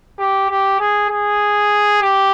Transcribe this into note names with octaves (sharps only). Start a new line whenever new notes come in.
G4
G4
G#4
G#4
G4